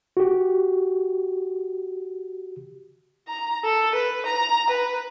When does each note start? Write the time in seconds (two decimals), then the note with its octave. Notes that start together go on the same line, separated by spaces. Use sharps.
0.17 F#4 G4
3.28 A#5
3.64 A4
3.95 B4
4.27 A#5
4.70 B4